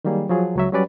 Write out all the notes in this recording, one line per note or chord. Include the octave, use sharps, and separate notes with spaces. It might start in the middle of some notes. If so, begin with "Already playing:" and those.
D#3 F#3 G3 A#3 G#4
F3 F#3 F4 G#4
C#2 F#3 E5
F#3 G3 C#4 B4 D5